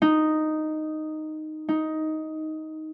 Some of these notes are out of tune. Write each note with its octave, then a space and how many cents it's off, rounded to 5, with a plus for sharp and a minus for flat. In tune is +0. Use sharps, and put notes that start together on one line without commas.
D#4 -5
D#4 +10